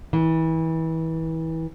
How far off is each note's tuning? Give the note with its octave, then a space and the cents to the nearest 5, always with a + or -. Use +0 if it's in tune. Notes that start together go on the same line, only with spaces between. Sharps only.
E3 -30